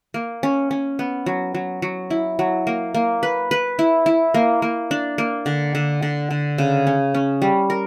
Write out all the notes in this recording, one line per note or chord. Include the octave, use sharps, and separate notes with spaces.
A#3
C#4
C#4
B3
F#3
F#3
F#3
E4
F#3
A#3
A#3
B4
B4
E4
E4
A#3
A#3
D4
A#3
D3
D3
D3
D3
C#3
C#4
C#4
G3
A#4